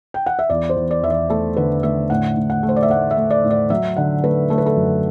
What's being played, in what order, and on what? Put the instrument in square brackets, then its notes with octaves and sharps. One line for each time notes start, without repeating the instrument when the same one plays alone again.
[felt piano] G5
F#5
E5
E2 D5
C5
E2
D5
E2 E5
D5
A3 A4
D3 B4
A3 E5
A2 F#5
A2
F#5
A3
C5
D5
E5
A3 F#5
E5
A3
D5
A2
D5
F#3 E5
D3 F#5
A3 B4
A3 A4
B4
A4
F#2